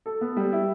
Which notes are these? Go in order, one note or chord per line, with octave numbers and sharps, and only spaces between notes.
A4
B3
G3
E4